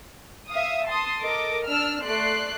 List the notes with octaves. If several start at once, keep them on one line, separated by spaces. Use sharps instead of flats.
E5 F5 D#6
A5 C6 D#6
A4 A#4 D#5 D6
D4 E6 F6
A3 D5 C6 F#6 C7